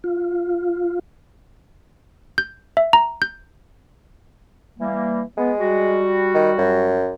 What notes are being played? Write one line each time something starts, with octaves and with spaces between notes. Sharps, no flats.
F4
G6
E5
A#5
G6
E3 G3 A#3
G#3 B3
G3 F#4
D#3
F#2